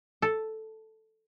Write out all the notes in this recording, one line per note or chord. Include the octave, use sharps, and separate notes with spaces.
A4